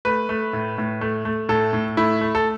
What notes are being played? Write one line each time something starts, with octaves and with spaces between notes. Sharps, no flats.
A3 B4
A3
A2
A2
A3
A3
A2 A4
A2
A3 E4
A3
A4